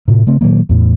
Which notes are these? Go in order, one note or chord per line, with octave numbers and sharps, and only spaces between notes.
A2 C3
C#3 A3 C4
A#2 D#3 F#3 A#3
E2 A2